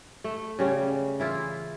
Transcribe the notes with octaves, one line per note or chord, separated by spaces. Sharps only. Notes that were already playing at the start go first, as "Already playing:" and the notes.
A3
C#3 G3 C#4
E3 E4 F4